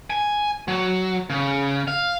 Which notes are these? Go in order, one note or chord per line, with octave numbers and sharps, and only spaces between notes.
G#5
F#3
C#3
F5